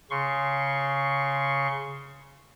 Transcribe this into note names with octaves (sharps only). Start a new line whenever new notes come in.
C#3 C6 C#6